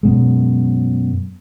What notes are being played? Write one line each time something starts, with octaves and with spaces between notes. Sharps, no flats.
F#2 B2 G#3